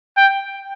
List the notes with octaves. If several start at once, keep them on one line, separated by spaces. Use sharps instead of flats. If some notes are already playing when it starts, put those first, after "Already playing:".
G5